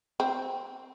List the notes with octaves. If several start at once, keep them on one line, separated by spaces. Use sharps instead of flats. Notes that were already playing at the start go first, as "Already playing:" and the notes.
C4